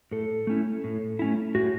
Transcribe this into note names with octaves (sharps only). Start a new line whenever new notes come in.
A2 A4
A3 C#4 E4
A2
A3 C#4 E4
A2 F#4